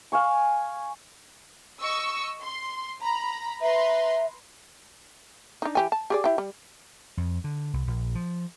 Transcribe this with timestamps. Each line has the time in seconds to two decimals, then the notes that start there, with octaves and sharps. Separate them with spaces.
0.12 F5 G#5 C#6
1.81 D#5 C#6 E6
2.43 C6
3.01 A#5 B5
3.61 B4 E5 A#5 C6
5.62 D4 D#4
5.75 E3 G4 G#5
5.92 A5
6.10 G4 G#4 D5
6.24 E4 G4
6.38 G3
7.17 F2
7.44 D3
7.73 C2
7.87 A#1
8.15 F3